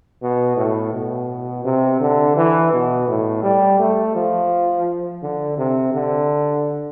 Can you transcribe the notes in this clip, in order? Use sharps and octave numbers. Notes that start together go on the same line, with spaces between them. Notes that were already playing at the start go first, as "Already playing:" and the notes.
B2
A2
B2
C3
D3
E3
B2
A2
G3
A3
F3
D3
C3
D3